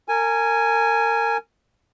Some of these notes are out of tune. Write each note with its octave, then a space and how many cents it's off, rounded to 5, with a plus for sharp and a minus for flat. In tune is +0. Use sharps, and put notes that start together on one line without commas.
A#4 -30 G#5 +0